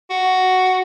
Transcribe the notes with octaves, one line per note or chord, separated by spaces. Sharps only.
F#4